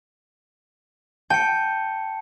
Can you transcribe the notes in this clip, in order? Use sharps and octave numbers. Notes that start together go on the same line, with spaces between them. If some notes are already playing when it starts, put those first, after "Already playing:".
G5 A5 C#7